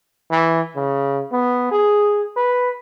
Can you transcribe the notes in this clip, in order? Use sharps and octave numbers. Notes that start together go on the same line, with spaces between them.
E3
C#3
B3
G#4
B4